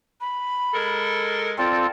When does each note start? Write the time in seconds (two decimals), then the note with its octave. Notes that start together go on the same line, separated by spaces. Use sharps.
0.21 B5
0.73 G#3 A4 A#4
1.58 C4 F4 A4 D5